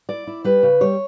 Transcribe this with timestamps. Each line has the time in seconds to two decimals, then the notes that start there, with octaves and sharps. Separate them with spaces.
0.09 E4 D5
0.27 E4
0.44 G3 B4
0.63 C#3
0.81 G3 C#5